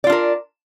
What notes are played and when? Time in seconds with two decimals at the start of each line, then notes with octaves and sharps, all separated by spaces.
0.04 D5
0.07 F4
0.09 D4
0.12 A#4